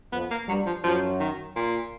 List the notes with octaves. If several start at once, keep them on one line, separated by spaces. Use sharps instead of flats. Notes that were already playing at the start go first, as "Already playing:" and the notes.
F2 F3 B3
A#3
G2 F#3 G3
F3
F#2 F3 F#3
D#3
A#2